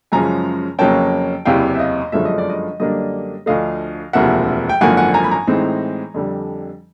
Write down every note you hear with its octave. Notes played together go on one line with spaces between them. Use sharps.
F#2 C#3 F3 G#3 G#5 A#5
F2 C#3 F#3 A#3 C#4 G5 A5
F#1 E2 C3 E3 F5 G5
E5
D#5 F5
G1 F#2 D3 F3 G#3 E5
D#5
D5
D#5
F#2 D3 G3 A#3 D4 D#5
D2 D3 F3 A3 D#5 F5
E1 D2 C3 F3 A#3 E5 F#5
G5
G#1 F#2 D3 F3 A#3 F#5 G#5
F#5 G#5
G#5 A#5
B5
G#5 A#5
A2 E3 G#3 C4 D#4
F2 D3 G3